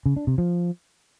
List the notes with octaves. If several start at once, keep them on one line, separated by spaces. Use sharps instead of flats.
C#3
D4
C3
F3